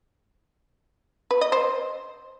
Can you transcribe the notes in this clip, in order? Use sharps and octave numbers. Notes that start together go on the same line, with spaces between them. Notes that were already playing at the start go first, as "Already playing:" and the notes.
B4
D#5
C5